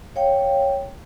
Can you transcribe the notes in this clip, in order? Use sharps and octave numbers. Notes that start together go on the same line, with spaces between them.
C#5 F5 G5